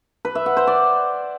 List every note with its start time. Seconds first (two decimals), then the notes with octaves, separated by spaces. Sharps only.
0.25 B4
0.35 E5
0.46 F#5
0.57 C5
0.67 D5